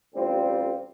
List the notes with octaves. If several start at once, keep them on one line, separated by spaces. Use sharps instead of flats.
A1 D2 G3 C4 F4